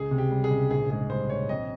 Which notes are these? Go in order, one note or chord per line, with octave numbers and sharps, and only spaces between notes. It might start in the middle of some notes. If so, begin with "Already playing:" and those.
Already playing: C#2 G#4
C3
G4
G3
G#4
C#2
A#1 G#4
G#2 G#4
G3 C5
A#1 C#5
F2 D#5